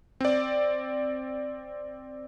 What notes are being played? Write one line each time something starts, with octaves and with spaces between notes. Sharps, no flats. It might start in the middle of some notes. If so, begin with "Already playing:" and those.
C4 D5